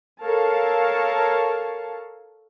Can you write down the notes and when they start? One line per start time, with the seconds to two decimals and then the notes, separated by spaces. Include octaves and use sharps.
0.22 A4 A#4 C#5 F5 A5